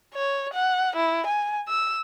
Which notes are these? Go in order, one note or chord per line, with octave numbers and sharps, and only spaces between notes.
C#5
F#5
E4
G#5
E6